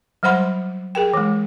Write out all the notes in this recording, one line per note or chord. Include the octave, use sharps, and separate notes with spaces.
F#3 G3 C5 F#5 B5 C6
G#4 A#4 G5
E3 G#3